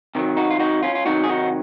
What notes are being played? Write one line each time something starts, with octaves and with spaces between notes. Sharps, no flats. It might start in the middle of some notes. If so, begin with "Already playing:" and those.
C3 D#3 F#3
D#4 F#4
F4
D#4 F#4
C#4 F4
F4
C3 D#3 F#3 D#4 F#4
G#4
D#4 F#4